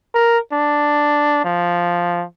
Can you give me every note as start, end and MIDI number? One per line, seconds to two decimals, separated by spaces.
0.15 0.38 70
0.53 1.43 62
1.45 2.24 53